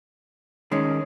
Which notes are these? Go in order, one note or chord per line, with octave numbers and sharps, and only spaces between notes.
D#3 G#3 C#4